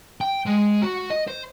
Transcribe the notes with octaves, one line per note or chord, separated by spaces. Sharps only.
G5
G#3
F#4
D#5
C5